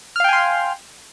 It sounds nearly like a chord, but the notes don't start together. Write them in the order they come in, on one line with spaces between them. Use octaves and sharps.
F6 F5 G5 G#5 C6